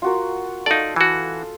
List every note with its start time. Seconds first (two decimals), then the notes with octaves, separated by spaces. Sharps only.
0.02 F4 F#4 A#4
0.66 D#4 A4 D5 F5
0.96 E3 F#4